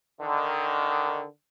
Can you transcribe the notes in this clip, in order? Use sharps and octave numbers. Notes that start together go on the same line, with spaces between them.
D3 D#3